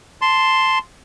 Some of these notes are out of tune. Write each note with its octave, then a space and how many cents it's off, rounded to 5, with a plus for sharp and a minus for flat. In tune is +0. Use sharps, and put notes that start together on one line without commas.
A5 +0 C6 +0